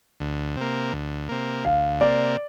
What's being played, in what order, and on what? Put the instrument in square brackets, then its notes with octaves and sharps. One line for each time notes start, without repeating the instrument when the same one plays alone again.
[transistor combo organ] D2
C3 A#3
D2
C3 A#3
[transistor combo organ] D2 [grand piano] F5
[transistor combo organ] C3 A#3 [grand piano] D5